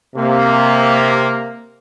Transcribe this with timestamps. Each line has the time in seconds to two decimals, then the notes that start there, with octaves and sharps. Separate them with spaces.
0.15 C3 A#3